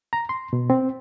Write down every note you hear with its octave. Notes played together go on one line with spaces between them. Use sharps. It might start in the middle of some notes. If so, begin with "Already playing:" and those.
A#5
C6
B2
C4